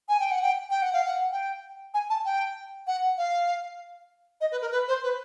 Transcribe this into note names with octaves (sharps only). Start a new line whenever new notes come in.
G#5
G5
F#5
G5
G5
F#5
F5
F#5
G5
G#5
A5
G5
F#5
F5
D#5
B4
A#4
B4
C5
B4